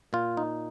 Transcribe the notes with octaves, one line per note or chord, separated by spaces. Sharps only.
A#2 F4
D#4